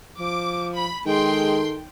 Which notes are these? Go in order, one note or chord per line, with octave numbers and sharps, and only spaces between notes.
F3 D6
B5
D#3 G#3 G#4 A4 G5 C6